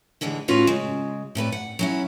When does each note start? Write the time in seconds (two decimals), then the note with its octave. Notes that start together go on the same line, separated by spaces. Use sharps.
0.21 A2 D3 E3 G#3
0.48 A2 C#4 F4 F#4 B4 C#5
0.67 C#3 G#3
1.35 A2 C3 B4 D5
1.52 F#5
1.79 F#3 C#4 E4